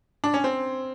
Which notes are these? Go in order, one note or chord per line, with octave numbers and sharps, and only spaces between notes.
D4
C#4
C4